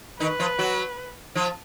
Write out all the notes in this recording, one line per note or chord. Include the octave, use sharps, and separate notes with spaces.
D#3 D#4 B4
F3 F4
F#3 F#4
F3 F4